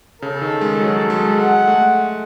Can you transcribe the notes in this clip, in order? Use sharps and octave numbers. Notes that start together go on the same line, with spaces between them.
C#3 A4
D#3
G#3
F#3
G#3
G#3 F#5
A3